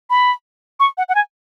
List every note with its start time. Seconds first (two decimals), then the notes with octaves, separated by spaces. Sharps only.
0.10 B5
0.80 C#6
0.98 F#5
1.09 F#5
1.15 G#5